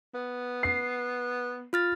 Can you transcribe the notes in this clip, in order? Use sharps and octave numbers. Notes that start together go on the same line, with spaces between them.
B3
C7
F4 F6 A6